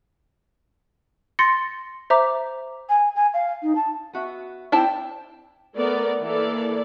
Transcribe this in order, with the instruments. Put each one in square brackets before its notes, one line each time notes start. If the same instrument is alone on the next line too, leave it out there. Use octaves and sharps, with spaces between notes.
[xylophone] C6 A6 A#6 C#7
C5 E5 A#5 D6
[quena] G#5
G#5
F5
D#4
A5
[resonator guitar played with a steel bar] B3 F#4 E5
[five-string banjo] C4 E4 A5 [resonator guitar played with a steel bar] D5 G5
[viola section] A3 B3 A#4 D5
E3 A#3 E4 A4 D5